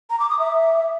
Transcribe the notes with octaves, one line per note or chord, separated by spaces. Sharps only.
A#5
D6
D#6
E5